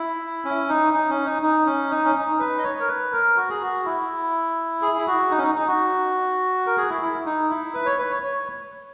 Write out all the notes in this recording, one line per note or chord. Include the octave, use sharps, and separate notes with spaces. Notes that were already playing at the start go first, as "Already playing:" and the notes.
Already playing: E4
C#4
D#4
D#4
C#4
D#4
D#4
C#4
D#4
C#4
D#4
B4
D#5
C#5
A#4
B4
A#4
F#4
G#4
F#4
E4
G#4
E4
F#4
D#4
C#4
D#4
D#4
F#4
A#4
G#4
E4
E4
D#4
E4
B4
C#5
B4
C#5
C#5